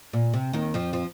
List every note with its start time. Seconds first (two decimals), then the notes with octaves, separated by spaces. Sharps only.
0.13 A#2
0.34 C3
0.53 D#2 D#3
0.74 F2 F3
0.93 F3